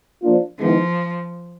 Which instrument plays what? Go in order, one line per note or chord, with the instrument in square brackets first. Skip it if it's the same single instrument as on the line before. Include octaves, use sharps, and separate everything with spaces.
[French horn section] F3 A#3 D4 F4
[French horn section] D#3 G#3 B3 E4 [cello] F3